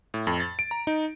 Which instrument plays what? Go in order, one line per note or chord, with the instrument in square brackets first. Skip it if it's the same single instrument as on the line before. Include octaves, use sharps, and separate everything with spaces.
[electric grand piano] A2
F2
A6
D7
A#5
D#4